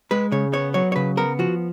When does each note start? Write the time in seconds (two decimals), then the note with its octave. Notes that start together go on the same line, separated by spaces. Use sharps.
0.11 G#3 B4
0.32 C#3 C#5
0.53 B3 C#5
0.74 F#3 C#5
0.92 C#5
0.96 C#3 B4
1.17 B3 A#4
1.39 F3 F#4